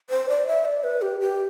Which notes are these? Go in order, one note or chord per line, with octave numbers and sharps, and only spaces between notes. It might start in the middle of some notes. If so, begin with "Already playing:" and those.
C5
D5
E5
D5
B4
G4
G4